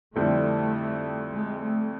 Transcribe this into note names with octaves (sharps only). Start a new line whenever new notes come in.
F2 D3 G3 A3 C4 E4
G#3
A3